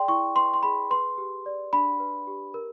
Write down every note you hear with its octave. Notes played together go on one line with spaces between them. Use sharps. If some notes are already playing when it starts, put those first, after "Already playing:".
Already playing: G#4 D5 G5 C6
E4 C#6
B4 C6
C6
G#4 B5
B4 C6
G4
D5
D4 B5
B4
G4
A#4